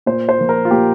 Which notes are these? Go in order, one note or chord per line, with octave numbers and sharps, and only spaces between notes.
A#2 C5
C5
F3 A#3
A#4
F4
A#2 G4